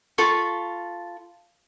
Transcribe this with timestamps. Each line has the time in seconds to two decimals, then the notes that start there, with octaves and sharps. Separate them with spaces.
0.18 F4 A4 B5 C#6